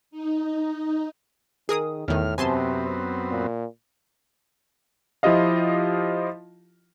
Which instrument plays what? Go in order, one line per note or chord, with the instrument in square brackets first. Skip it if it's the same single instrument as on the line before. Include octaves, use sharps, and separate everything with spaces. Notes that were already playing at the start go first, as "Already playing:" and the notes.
[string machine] D#4
[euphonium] D#3 [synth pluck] G#4 A#4 D#6
[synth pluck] E2 D#3 [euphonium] A2 [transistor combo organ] F6
[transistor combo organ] F#2 B3 C4 [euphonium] C3 [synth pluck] G#5 A5 C6
[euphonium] A#2
[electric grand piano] F3 E4 F4 G4 D#5 F5